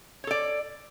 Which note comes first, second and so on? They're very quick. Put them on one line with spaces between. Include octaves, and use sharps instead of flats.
C#5 A4 D5